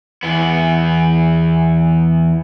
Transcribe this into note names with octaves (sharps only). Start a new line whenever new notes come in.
E2 B3